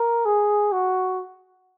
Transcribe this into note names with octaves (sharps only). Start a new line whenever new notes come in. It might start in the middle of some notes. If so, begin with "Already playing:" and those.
Already playing: A#4
G#4
F#4